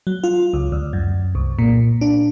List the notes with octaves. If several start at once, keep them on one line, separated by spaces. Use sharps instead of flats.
F#3
F4
C#2
D2
F#2
C2
A#2
D4